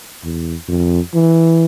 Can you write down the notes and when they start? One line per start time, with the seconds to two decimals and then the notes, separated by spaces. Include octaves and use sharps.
0.23 E2
0.68 F2
1.14 E3